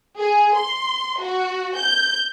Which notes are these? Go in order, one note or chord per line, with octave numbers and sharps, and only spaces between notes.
G#4
C6
F#4
G6